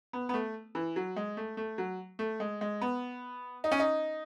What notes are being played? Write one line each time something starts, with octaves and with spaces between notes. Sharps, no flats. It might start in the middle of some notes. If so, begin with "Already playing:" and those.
B3
B3
A3
E3
F#3
G#3
A3
A3
F#3
A3
G#3
G#3
B3
D#4
C#4
D#4